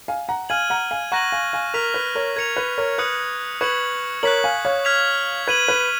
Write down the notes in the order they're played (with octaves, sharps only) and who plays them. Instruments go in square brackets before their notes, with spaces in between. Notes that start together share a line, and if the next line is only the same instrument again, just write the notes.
[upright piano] F5 G#5
F#5 A#5
[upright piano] F5 G#5 [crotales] F6 G#6 D#7 F#7
[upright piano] F#5 A#5
F5 G#5
[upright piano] F#5 A#5 [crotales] C#6 F#6 A#6 D#7 F#7
[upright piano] F5 G#5
F5 G#5
[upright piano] A#4 [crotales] F6 B6 F7
[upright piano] B4
A#4 C#5
[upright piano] A#4 [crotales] G#6 C#7 F7
[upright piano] B4
A#4 C#5
[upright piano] B4 [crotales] D#6 F#6 C#7
[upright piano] B4 [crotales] C#6 G#6 C#7 F#7
[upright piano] A#4 C#5 [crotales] F#6 B6 F#7
[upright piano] F5 G#5
C#5 F5
[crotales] F6 G#6 B6 F7
[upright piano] B4 [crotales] G#6 D#7 F#7
[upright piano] B4